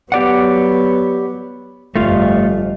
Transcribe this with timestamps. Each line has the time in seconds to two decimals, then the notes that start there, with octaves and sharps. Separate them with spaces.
0.12 F#3 B3 G4 D5 F#5
1.96 G1 F2 A3 F4 F5